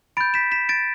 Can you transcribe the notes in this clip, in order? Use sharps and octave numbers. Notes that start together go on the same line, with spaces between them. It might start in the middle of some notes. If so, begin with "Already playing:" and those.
B5 G6 A6 D7
B6 E7
B6 E7
A6 D7